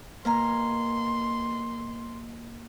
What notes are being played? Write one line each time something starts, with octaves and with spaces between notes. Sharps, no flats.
B2 A#3 G#5 A#5 C6